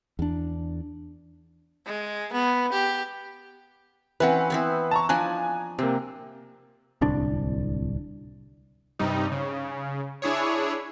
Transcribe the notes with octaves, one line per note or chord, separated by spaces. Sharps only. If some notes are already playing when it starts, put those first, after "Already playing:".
E2 D4
G#3
B3
G4
E3 C4 C#4 B4 F#5
B3 C4 E4
A5 A#5 C#6
F3 D4 D#5 G#5 A#5 F#6
C3 A#3 C4
D1 C2 D4
G2 C3 G3 D#4
C#3
D4 E4 G#4 C#5